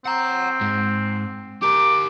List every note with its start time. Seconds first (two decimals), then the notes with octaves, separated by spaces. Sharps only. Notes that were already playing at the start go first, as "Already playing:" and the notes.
0.05 C4 F#5 A#5
0.61 G#2
1.62 G4 A#4 D6